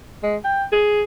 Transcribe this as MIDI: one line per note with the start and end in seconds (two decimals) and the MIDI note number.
0.23 0.36 56
0.45 0.64 79
0.73 1.03 68